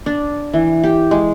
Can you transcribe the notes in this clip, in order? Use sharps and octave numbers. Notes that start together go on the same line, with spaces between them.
D4
E3
G4
G#3